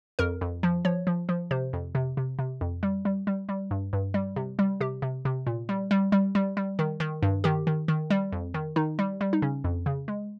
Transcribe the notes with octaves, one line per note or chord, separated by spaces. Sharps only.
F2 A#4
F2
F3
F3 C#5
F3
F3
C3 C5
F2
C3
C3
C3
F2
G3
G3
G3
G3
G2
G2
G3
C3
G3
C3 G4
C3
C3
A#2
G3
G3
G3
G3
G3
D#3
D#3
G2
D#3 G4
D#3
D#3
G3
F2
D#3
D#3 D#4
G3
G3
D#4
C#3 C#4
F2
C#3
G#3